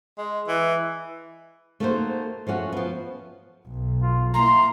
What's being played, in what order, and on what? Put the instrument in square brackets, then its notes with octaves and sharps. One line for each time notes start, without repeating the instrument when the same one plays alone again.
[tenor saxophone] G#3
E3
[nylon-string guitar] A3 A#3 D#4 F#4 A4 C5
F3 A3 C#4 F#4
F3 B3
[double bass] B1
[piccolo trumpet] F4
[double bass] A#3 E4 [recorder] A#5 [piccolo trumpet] C6